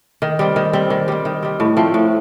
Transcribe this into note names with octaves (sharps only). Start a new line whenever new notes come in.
D#3
G3 C4
D#3
G3 C4
D#3
G3 C4
D#3
G3 C4
A2
F3 A3 C4
A2